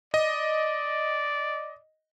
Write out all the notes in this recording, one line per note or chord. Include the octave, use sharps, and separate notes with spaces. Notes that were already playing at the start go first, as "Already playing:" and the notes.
D5 D#5